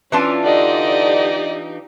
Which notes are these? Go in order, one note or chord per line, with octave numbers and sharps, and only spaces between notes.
E3 C#4 D4 F4
D3 D#4 G4 D5 D#5